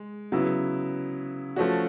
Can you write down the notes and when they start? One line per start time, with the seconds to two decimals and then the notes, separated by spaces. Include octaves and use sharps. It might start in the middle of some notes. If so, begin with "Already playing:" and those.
Already playing: G#3
0.32 C#3 F#3 B3 E4
1.56 F3 A3 C#4 F#4